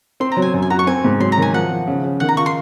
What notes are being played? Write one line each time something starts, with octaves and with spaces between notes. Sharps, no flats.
C4 C6
A#5
F#3
G#5
F#2
G#5
F#4 A#5
C#6
C4 G#5
G#2
F#3 C6
A#5
D#3 G#5
F3 F#5
F3
C#3
C#3
D#3 F#5
A#5
F4 C#6
C6